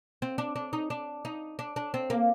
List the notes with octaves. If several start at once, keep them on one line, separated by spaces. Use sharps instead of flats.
C4
D4
D4
D#4
D4
D#4
D4
D4
C4
A#3